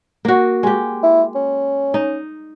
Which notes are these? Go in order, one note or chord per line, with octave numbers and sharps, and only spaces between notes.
A#3 F#4
G#3 G4
E4
C#4
D#4